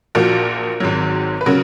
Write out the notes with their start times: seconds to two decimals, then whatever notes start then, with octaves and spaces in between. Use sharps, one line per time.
0.15 A#1 A#2 F3 F#4 A#4
0.80 G#1 G#2 D#3 F#3
1.41 B4
1.46 C#3 F#3 F#4 A#4